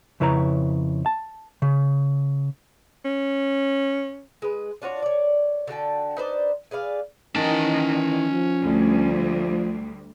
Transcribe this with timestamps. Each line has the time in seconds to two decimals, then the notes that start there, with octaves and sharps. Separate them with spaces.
0.20 F2 C#3 E4 B4 C#5 A#5
1.06 A5
1.62 C#3
3.05 C#4
4.42 G#3 B4
4.82 D4 F4 F#4 C#5
5.03 C#5 D5
5.67 D3 F#4 G5 A5
6.17 D#4 B4 C5 D5
6.71 G#4 B4 D5 F5
7.36 D#3 E3 C#4 A5
8.30 F3
8.61 D2 G3